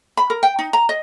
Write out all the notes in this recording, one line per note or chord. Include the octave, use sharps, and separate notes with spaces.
B5
A#4
G5
D#4
A#5
D#5